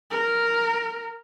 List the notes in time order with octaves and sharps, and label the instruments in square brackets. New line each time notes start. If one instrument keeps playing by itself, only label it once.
[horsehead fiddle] A#4